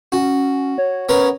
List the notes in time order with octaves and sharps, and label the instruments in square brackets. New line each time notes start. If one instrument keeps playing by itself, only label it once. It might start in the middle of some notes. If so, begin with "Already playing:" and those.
[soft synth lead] C#4 [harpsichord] F#4
[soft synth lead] C#5
[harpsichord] B3 C#4 A#4